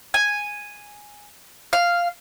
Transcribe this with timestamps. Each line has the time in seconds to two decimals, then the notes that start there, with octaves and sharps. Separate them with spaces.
0.14 G#5
1.73 F5